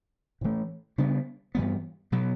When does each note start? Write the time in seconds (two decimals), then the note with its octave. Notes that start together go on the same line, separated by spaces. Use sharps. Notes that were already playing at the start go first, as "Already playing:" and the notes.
0.41 A2 E3 A3
0.98 C#3 G3 B3 D4
1.55 G2 E3 G3 B3
2.12 B2 F#3 B3